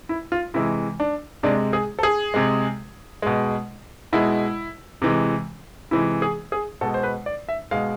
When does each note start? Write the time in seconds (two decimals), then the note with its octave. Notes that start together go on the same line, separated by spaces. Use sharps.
0.09 E4
0.32 F4
0.54 C3 E3 G#3 E4
1.00 D4
1.43 C3 G#3 D4
1.73 G#4
1.99 A4
2.03 G#4
2.34 C3 G#3
3.22 B2 G#3
4.13 B2 G#3 E4
5.02 C3 E3 G#3
5.91 C3 E3 G#3 E4
6.22 G#4
6.52 G#4
6.81 B2 G#3 A4
6.94 C5
7.03 B4
7.26 D5
7.49 E5
7.71 B2 G#3 F5